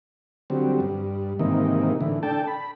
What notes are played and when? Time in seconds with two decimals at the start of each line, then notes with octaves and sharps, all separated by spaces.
0.50 D3 F#3 G3 C4
0.80 G2
1.39 G#2 C3 D#3 E3 A#3 D#4
2.01 A2 D3 E3
2.23 D4 A4 G5 A5
2.47 B5